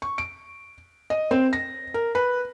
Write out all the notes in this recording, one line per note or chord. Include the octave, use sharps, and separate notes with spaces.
C#6
D7
D#5
C4
A#6
A#4
B4